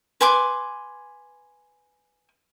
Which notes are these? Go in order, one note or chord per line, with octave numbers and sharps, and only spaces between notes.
B4 G#5 C6 D6